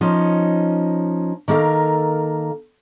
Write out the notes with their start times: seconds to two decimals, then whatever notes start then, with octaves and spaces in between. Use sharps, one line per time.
0.01 F3 C#4 D#4
1.48 D#3 A#3 A4 A#4 F5